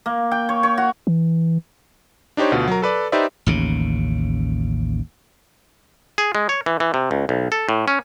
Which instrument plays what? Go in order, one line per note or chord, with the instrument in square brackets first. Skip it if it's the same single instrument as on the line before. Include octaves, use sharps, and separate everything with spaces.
[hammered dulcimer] A#3
G5
C#5
C#5
F#4
[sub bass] E3
[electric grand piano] D4 D#4 G4 C5 C#5
D2 B2 F4
F#3 A#4
A4 B4 D5
D#4 G4 B4 C5 D5 E5
[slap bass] A1 D#2 C#3
[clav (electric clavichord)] G#4
G#3
C#5
E3
E3
C3
C#2
B1
A4
A2
C#4